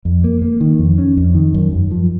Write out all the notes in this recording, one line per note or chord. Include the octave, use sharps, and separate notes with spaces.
F2
A#3
A#3
D#3
F2
C#4
F2
D#3
F#2
F#2
F3